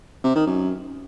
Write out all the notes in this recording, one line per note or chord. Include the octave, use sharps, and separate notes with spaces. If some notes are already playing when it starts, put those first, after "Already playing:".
C3
D#3
F#2